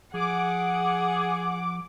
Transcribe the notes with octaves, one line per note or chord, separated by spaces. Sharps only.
F3 G#4 F#5 D6